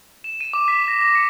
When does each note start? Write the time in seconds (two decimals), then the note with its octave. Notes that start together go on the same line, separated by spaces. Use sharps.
0.24 E7
0.41 D#7
0.53 D6
0.68 B6
0.88 A#6
1.01 A#6
1.15 C#7